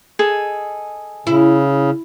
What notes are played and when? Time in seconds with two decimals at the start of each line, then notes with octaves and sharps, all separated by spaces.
0.19 G#4 A4 D#5
1.27 C#3 E4